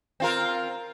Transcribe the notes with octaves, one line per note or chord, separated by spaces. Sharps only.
C4 F4 A#4